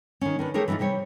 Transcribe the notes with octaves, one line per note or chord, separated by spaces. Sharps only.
D#3 C#4
D#3 D4 B4
A3 G4 G#4 A#4 C#5
E3 B3 C#4 D#4 F4
C3 G3 G4 C#5